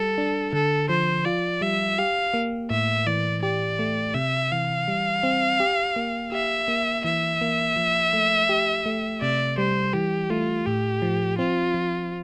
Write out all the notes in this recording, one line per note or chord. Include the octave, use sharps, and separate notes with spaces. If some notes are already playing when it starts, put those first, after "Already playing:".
Already playing: G3 A4
D4
D3 A4
F3 C5
F4 D5
G3 E5
G4 F5
A#3
A2 E5
E3 D5
G4 D5
A3
C3 E5
E3 F5
G3
C4
G4
A#3
G4 E5
A#3
E3 E5
A#3
F3
A3
G4
A3
C3 D5
G3 C5
E3 G4
A3 F4
A2 G4
F3
C4 F4
F3